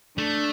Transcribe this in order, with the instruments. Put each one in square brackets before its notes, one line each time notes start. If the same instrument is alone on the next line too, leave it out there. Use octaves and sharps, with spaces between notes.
[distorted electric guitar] A3 [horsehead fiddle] D4